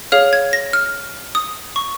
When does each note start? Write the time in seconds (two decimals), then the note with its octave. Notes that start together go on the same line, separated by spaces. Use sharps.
0.12 G#4 C#5 F5 F6
0.33 G#6
0.53 A#6
0.73 F6
1.35 D#6
1.76 C#6